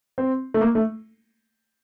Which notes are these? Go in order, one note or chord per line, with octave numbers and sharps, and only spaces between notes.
C4
A3
A#3
A3